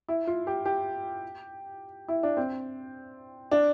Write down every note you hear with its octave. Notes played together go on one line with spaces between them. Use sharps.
E4
F4
G4
G4
E4
D4
C4
D4